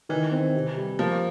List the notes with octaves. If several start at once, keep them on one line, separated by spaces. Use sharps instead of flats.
D#3 E3
C4
C3
G3
F3 A#3